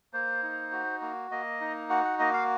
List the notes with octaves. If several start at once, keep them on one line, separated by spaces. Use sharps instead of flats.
A#3 C5
D#4
F#4
A#3
A#3 D#5
D#4
F#4 F#5
F#5
A#3 D#5
F5